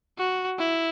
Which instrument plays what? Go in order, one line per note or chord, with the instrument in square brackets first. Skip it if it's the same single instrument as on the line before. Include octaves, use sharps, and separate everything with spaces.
[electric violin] F#4
E4